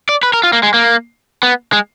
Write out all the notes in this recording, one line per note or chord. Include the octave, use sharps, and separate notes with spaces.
D5
B4
A#4
F4
A#3
G#3
A#3
B3
G#3